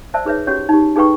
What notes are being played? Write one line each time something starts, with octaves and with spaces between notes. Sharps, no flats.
C5 D5 E5 A5 E6
D#4 G#4 B4 C#5 E5
C#4 F#4 G4 C#5
D#4 G4
D#4 G#4 A4 B4 G5 C#6